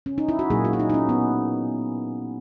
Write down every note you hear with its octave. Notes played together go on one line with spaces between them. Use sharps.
C#4
D#4
E4
F#4
A#2 F#3 A#3 G#4
F#4
E4
D#4
D#4
C#4
B3